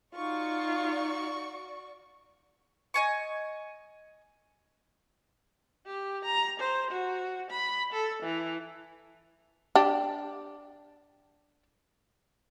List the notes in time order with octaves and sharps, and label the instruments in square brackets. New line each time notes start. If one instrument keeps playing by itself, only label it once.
[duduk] D#4 [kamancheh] F4 [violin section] F#4 D5 C#6
[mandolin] D#5 G#5 C#6
[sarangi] G4
A#5
C5
F#4
B5
A4
E3
[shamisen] D4 G4